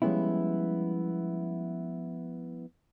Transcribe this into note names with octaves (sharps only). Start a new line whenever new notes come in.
F3 G3 G#3 B3 C#4 E4